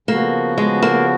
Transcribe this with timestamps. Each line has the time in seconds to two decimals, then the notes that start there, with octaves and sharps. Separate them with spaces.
0.08 C#3 F3 A#3 B3 F#4
0.58 G#3
0.82 A#3